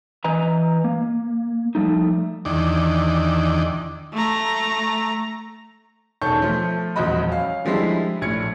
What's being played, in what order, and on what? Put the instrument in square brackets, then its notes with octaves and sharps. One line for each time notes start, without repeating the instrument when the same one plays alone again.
[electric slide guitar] E3 B4 D#5 G#5 A#5
A#3
F3 G3 A3 D#4
[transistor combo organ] E2 D#3 D4
[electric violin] A3 A#5
[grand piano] E1 D#3 C#4 A4 C#6 G6
F3 A3
D#1 E2 F3 F#4 D#5 B5
C#4 F5
D3 F3 G3 G#3 E4
A#1 A2 G#6 C#7